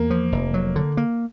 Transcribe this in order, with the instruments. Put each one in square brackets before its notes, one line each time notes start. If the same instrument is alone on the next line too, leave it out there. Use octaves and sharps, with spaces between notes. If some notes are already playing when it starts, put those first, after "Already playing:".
Already playing: [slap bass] E2 [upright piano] A#3
[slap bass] F3
F1
F#3
D3
A#3